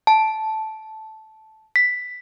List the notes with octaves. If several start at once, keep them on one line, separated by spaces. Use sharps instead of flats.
A5
B6